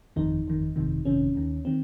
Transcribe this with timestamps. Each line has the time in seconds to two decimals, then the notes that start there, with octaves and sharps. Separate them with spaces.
0.16 G1 F2 D#3 D#4
0.46 G1 F2 D#3
0.76 G1 F2 C3 D#3
1.05 G1 F2 C3 D#3 C#4
1.35 D#2 D#3
1.65 D#3 C4